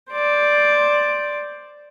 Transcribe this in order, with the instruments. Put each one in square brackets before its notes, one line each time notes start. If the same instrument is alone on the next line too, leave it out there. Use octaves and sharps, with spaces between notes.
[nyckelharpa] C5 D5